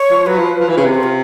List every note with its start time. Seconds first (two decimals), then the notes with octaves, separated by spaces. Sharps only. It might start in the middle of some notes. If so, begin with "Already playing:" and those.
Already playing: C#5
0.10 F3
0.26 F#3 B4
0.38 F3
0.60 F3
0.69 E3
0.77 C#3
0.85 C3
0.94 C5
1.03 F4